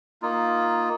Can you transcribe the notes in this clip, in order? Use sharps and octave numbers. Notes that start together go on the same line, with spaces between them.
A#3 D#4 F4